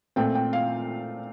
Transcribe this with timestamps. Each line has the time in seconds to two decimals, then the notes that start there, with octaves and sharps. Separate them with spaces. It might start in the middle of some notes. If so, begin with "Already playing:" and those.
0.16 A#2 A3 C4 G5
0.35 G5
0.53 F5